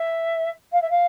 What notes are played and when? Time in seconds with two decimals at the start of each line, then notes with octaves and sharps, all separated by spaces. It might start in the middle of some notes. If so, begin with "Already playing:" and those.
Already playing: E5
0.72 F5
0.81 E5
0.90 F5